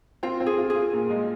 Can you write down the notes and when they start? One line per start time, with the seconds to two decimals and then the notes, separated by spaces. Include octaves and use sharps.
0.23 C4 F4
0.40 C4
0.47 G#4
0.58 F4
0.70 F4 G#4
0.93 A#2
1.10 G#3